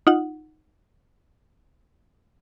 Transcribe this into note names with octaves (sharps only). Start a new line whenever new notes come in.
D#4 F4 F#5